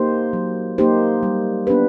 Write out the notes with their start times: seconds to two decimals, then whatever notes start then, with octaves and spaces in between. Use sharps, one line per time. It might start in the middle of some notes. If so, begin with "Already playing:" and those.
Already playing: A#3 D#4 G4 C5
0.33 F#3
0.78 A#3 D#4 G4 C5
1.23 G3
1.67 B3 D4 G4 B4